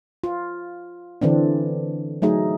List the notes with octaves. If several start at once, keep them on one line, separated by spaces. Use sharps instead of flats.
F4
D3 E3 C4 D4
F#3 A3 D#4 G#4